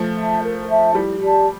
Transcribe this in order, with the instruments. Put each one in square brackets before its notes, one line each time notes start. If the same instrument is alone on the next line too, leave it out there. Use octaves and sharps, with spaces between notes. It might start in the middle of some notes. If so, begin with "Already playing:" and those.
Already playing: [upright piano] F3 A3
[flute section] E5 A5
A#4
E5 A5
[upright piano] G3 [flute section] E4
[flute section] G4 D5 A5